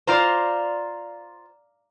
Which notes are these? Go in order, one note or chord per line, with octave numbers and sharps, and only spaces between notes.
F4 C5 D5 F5 A#5